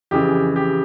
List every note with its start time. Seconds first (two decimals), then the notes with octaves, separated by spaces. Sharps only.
0.11 F2 C#3 E3 G4
0.56 G4